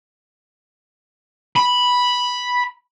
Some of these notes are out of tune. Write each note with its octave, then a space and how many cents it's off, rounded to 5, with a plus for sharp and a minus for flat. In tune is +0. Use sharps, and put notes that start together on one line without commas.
B5 -5